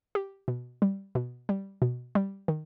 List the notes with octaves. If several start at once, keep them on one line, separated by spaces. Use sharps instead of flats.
G4
B2
G3
B2
G3
B2
G3
D#3